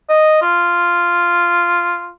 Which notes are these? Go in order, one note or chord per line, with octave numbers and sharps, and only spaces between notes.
D#5
F4